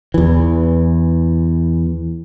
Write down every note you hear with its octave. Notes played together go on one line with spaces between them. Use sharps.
E2 E3